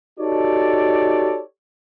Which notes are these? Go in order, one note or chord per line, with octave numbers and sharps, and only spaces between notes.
D#4 F#4 G4 A4 C#5 D5